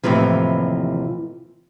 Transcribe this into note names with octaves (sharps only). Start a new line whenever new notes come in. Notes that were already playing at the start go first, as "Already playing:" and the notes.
D#2 A2 C3 E3 F3